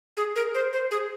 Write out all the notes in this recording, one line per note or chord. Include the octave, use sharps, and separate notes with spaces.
G#4
A#4
C5
C5
G#4